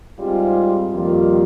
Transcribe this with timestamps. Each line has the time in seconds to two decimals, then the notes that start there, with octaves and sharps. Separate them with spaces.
0.19 G#2 G3 C4 F4
0.90 F2 D#3 G3 A#3 F4